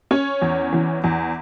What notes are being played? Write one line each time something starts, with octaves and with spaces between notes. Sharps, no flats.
C#4 C#5
E2
E3
E2